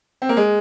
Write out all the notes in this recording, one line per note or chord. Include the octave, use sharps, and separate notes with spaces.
C4
A#3
G#3